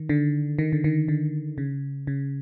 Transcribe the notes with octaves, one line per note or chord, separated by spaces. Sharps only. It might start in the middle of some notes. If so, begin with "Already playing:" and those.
Already playing: D#3
D3
D#3
D3
D#3
D3
C#3
C#3